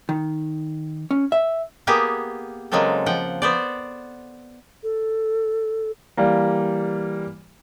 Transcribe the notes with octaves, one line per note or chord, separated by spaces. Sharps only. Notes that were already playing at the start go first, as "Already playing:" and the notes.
D#3
C#4
E5
A#3 B3 G4 G#4
C#3 F#3 G#3 A#3 C4 A4
F3 F#5 G5
B3 C5 D5
A4
E3 G3 A#3